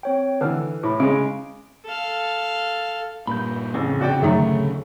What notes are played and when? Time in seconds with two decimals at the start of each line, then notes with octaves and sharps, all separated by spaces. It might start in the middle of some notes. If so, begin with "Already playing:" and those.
0.03 C4 C#5 G5
0.41 D3 E3 B4 F6
0.83 A2 B5 D6
1.00 C#3 G#3 D7
1.85 A4 F5
3.27 G2 A#2 B5 G6
3.74 A1 F2 C#3
4.01 C3 B3 D4 F#4 D5 G5
4.22 D1 F#2 D3 D#3 A3